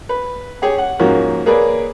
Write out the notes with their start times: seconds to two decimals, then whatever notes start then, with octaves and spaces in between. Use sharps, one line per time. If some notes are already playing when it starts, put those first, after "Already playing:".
0.09 B4
0.62 G4 G#4 C#5
0.78 F#5
0.99 G#2 F3 A#3 C#4 F#4
1.46 A#3 G#4 A#4 B4 C#5 D5